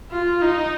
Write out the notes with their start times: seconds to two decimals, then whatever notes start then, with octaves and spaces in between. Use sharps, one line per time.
0.11 F4
0.42 D#4